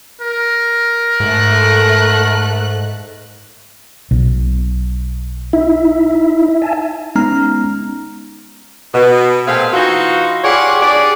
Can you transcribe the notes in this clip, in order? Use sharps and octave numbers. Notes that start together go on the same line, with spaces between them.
A#4
G#2 A3 F#6
B1
D#4 E4 E5
E5 G#5 A5
G#3 B3 C#4 D#4 A#5 F6
B2
A#2 A3 C4 G#4 F5
E3 D#4 F4 F#4
F4 G4 G#4 C#5 D5 F#5
D4 G4 G#4 D5